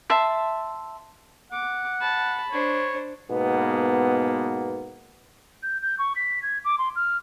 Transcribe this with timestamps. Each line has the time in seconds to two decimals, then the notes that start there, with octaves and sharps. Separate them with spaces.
0.10 E5 A5 C6
1.52 F#5 D6
2.01 A5 B5
2.52 D4 C5 C#5
3.31 G#2 B2 A#3 B3
5.63 G6
5.82 G6
5.99 C#6
6.16 B6
6.42 G#6
6.65 D6
6.78 C6
6.96 F6